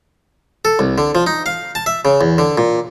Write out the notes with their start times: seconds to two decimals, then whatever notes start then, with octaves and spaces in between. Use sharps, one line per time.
0.65 A4
0.79 C2
0.98 D3
1.15 F3
1.27 D#4
1.46 F5
1.75 A5
1.86 E5
2.05 C#3
2.21 E2
2.38 D3
2.58 A#2